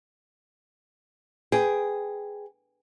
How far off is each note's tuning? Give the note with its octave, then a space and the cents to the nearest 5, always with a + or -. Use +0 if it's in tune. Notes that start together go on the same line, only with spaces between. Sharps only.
G#4 +0 B4 +25 G5 +0